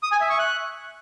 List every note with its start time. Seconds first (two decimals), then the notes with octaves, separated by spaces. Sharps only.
0.03 D#6
0.12 G#5
0.21 E5
0.30 C#6
0.39 F#6